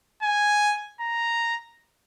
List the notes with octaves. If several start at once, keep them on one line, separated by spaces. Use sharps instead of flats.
G#5
A#5